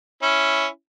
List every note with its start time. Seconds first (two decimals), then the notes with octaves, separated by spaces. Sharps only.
0.22 C#4 E4